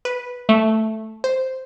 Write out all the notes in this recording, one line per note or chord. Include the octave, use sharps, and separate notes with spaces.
B4
A3
C5